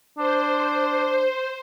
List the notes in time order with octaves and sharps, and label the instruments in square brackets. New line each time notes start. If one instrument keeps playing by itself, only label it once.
[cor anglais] D4 [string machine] C5